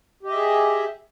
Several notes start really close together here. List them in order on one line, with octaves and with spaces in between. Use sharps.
G4 D#5 E5 G#4